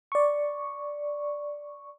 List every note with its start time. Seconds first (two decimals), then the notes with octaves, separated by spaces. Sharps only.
0.12 D5 C#6